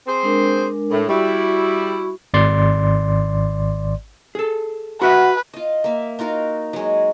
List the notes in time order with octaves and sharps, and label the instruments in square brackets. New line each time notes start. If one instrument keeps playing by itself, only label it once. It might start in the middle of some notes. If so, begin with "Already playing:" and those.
[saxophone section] C4 G#4 C5
[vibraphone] G#3 D4 A#4
[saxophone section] A2
[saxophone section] G3 E4 [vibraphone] F#4 C#6
[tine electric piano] G#1 D5 C6
[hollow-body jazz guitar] G#4 A4
[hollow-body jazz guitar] F#4 E5 A#5 [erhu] B4 [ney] F#5
[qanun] F4 D#5
A#3 E5
D#4 F4 F#4 A#4
F#3 G#3